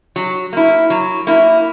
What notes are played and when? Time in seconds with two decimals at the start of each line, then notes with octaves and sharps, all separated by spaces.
0.16 F#3
0.53 A#3 E4
0.90 F#3
1.27 A#3 E4